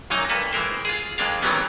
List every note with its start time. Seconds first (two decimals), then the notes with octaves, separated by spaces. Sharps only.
0.10 F#2 A#2 F#3 A#3 D#4 A#5
0.30 G2 A#3 A4 B4
0.53 E3 G#3 A#4 C5
0.85 F4 G#4
1.18 F2 G#3 A#3 D4 F5
1.42 D#3 E3 F#3 G3 B3 C#4